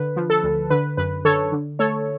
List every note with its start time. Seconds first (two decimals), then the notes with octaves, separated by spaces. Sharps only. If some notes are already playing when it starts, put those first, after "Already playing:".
Already playing: D3 B4
0.16 F3
0.30 A4
0.43 D2
0.70 D3 B4
0.97 F#2 B4
1.25 D3 A4 C#5
1.52 D3
1.79 A3 A4 C#5